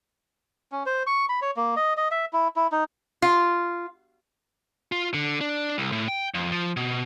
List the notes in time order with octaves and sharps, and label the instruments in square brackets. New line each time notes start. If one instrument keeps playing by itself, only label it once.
[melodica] C#4
C5
C#6
B5
C#5
A#3
D#5
D#5
E5
E4
E4
D#4
[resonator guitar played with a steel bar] F4
[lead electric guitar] F4
D3
D4
C2
A2
G5
F2
F3
B2